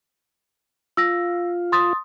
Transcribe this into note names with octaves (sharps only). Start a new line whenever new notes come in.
F4 E6 A#6
C6 D#6 A6